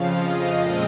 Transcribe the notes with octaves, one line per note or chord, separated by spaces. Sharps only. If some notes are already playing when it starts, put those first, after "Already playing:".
Already playing: F2 C#3 F3 F5
D#5
A#2 F3 G#3 C4 D#5